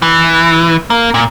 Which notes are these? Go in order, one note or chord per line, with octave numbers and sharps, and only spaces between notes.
E3
A#3
A#2